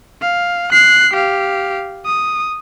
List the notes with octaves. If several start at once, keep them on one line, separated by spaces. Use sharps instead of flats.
F5
F#6 C7
G4 F5
D#6